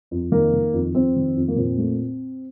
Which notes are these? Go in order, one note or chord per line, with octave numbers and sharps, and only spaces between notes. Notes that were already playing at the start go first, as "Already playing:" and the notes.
F2
D#3 A#3
D#3
F2
F2 C4
D#3
F2
A#3
A#2 C4
A3